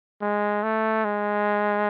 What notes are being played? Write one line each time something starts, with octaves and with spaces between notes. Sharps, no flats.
G#3
A3
G#3